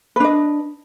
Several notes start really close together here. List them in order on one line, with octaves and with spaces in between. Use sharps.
B4 D4 D#5